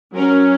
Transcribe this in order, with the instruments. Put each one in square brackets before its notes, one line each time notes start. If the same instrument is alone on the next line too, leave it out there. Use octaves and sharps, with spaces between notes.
[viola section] F#3 C#4 A#4